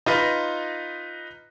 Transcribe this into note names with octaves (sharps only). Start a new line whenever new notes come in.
D#4 F4 B4 D#5